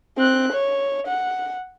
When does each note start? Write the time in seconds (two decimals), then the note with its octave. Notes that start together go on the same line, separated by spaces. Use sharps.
0.17 C4 F#6
0.53 C#5
1.07 F#5